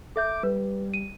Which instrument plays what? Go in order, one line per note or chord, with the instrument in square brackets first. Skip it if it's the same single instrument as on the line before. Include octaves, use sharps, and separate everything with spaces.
[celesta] A4 E5 G6 [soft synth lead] D6
[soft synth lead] G3 [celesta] B4
[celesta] D#7